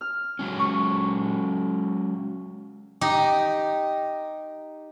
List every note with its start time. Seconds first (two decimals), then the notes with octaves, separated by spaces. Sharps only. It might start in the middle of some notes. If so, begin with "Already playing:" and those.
0.01 F6
0.39 F#3 G#3 C#4
0.59 C#6
3.01 D#4 G4